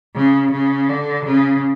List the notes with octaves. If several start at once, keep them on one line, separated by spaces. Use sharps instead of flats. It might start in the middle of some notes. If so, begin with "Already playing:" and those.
C#3
C#3
D3
C#3